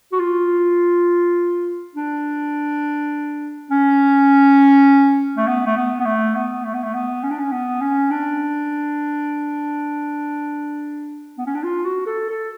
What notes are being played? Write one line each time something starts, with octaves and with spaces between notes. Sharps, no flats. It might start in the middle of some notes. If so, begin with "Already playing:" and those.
F#4
F4
D4
C#4
A3
B3
A3
B3
B3
A3
B3
A3
B3
A3
B3
C#4
D4
C#4
B3
C#4
D4
B3
C#4
D4
F4
F#4
A4
A4